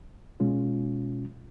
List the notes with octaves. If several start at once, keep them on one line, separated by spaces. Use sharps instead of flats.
B2 G#3 C#4 F4